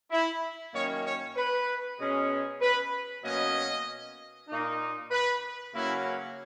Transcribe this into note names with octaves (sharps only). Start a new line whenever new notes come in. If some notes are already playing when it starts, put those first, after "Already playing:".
E4
F#2 D#3 A#3 C#4 C#5
C#5
B4
B2 G#3 C#4
B4
B2 F#3 A#3 C#4 D#5
A#2 A#3 D#4
B4
C#3 F#3 A#3 C#4 E4